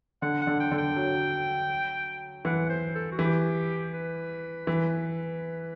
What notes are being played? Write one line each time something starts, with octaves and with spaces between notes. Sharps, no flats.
D3 F#5
F#5
D3
G5
D3
G5
F#3
E3 F#5
C5
A4
F#4
E3 G4
B4
E3